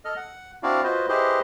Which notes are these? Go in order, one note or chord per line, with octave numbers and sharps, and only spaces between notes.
A4 D#5 F6
F#5
C4 D4 E4 F#4 D5 F5
F4 F#4 B4 C5 D#5
E4 G4 G#4 B4 C5 D#5